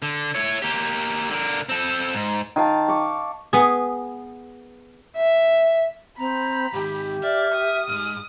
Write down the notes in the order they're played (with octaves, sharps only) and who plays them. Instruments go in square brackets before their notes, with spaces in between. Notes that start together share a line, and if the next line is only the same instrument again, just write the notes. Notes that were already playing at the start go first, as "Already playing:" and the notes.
[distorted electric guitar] D3
E4 C#5
A#3 G4
D3 A#4
C4 A4
G#2
[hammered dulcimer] D#3 F5 A5
C#6 D6
[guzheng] B3 G#4
[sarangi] E5
[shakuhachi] C4 [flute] A#5 [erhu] B5
[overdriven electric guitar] G#2 D#3 [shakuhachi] G4
[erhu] D5 [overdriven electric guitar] E5 [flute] F6
[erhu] D#6
[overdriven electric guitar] G#2 G#3 [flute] F6